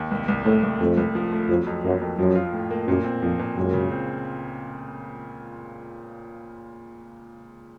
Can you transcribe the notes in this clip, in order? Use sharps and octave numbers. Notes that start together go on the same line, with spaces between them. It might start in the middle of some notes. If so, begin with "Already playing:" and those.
Already playing: D#2
C2
C2
A2 A3
C2
F2 A3
C2
F3
A3
F2 F#3
F2
F#2 A#3
F2
F#2 F3
F4
A2
A#3
F#2 A#2
C4
F2 F3
A#2
C#2 F#2
C#3
C4